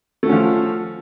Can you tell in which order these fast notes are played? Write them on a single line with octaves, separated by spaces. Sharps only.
A3 F#4 C#4 F3